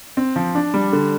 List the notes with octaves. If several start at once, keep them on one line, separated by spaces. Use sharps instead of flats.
C4
F3
D4
G3
D3